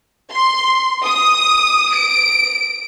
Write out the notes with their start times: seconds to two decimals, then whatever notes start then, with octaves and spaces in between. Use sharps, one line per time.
0.33 C6
1.06 D#6
1.95 D7